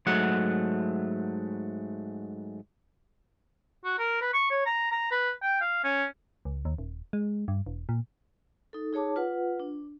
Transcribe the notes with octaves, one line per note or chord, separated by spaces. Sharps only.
G#2 F#3 A3 F#5
F#4
A#4
B4
C#6
C#5
A#5
A#5
B4
G5
F5
C#4
C#2
D#2
D#1
G#3
G2
E1
A#2
D#4 A4
D#4 G#4 C#5 A5 D6
F4 B4 F#5
D4